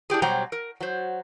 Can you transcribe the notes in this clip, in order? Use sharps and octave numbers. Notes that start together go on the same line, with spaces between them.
D4 E4 G4 G#4
B2 F#3 G3 C5 G5 A#5
A#4
F#3 C5